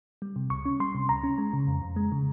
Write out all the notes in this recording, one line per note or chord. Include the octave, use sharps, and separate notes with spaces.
G3
C3
C#2 C#6
C#4
G3 C6
C3
C#2 A#5
C#4
G#3
C#3
F2
F2
G#3
C#3